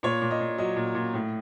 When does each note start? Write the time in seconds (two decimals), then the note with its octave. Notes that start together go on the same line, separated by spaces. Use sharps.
0.03 A#2 C#5
0.22 A#2
0.31 D#5
0.40 A#2
0.58 F#3 D#5
0.76 A#2
0.95 A#2
1.14 A2